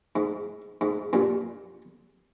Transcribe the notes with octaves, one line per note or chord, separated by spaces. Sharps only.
G#2
G#2
G2 A#2